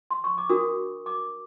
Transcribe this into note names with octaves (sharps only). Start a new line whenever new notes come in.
C6
C#6
D6
D4 F#4 A#4 D#6
D6